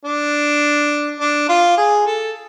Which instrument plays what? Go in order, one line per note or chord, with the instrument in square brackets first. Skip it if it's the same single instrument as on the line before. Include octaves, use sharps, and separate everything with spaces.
[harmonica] D4
D4
F4
G#4
A4